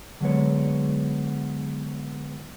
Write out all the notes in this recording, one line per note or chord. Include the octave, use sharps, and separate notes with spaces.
D3 F#3 G#3 B3 C#5